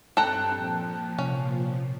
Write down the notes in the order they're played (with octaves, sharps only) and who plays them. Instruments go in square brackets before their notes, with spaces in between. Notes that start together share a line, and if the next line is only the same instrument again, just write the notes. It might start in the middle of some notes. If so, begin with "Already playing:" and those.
[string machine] G2 C4 [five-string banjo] A4 A#5 [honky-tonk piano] G5 A5 F#6
[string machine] A#2 F3
[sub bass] C3 [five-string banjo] C#4